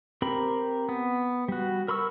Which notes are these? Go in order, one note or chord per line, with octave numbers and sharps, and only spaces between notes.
C4 G4 A#4 B5
B3
G3 F#4
A#4 B5 C#6 E6